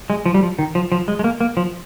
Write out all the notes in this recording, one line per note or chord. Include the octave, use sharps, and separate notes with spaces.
G#3
F3
G3
F3
D#3
F3
F3
G#3
G#3
A#3
A#3
F3